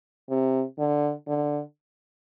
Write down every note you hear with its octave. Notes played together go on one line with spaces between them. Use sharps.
C3
D3
D3